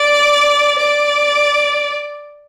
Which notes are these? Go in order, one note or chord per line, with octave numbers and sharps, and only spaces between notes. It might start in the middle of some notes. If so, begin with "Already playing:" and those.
Already playing: D5
D5